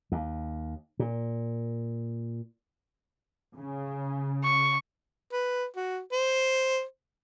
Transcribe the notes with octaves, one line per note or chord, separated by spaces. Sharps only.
D#2
A#2
C#3
C#6
B4
F#4
C5